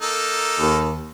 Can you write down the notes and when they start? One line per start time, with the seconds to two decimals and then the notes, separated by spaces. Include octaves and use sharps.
0.01 A#3 D#4 A4
0.60 D#2